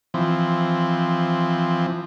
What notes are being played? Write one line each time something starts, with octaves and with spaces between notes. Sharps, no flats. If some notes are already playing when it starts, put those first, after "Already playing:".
E3 F3 C4